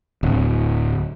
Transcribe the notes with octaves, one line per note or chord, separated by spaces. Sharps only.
D1